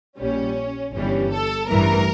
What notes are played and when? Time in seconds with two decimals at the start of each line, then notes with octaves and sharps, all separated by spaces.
0.17 A#1 A#2 G3 C#4
0.93 G1 G2 E3 G3 C#4
1.31 A4
1.69 A1 G2 E3 A#4